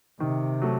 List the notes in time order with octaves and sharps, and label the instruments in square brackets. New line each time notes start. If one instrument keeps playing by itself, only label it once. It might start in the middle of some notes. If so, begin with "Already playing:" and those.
[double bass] C3 [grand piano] D#3
[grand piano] F#3 A3